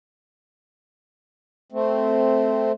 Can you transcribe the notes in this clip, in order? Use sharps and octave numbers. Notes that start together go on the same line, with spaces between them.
A3 C4